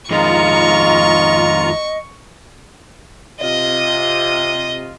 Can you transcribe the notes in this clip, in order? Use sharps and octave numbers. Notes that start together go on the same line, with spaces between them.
F2 D#3 G#3 F4 D#5 A#5 C#6
C3 F4 D#5